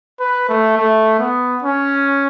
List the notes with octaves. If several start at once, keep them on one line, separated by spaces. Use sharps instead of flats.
B4
A3
A3
B3
C#4